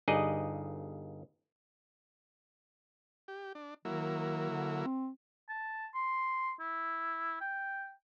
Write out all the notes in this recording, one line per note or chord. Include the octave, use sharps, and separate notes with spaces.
G1 G2 D#4 G#4 D5 D#5
G4
D4
D#3 F#3 A#3 E4
D3
C4
A5
C6
E4
G5